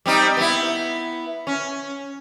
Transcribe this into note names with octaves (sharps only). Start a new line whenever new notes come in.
G3 C4 D#4
B3 E4
C#4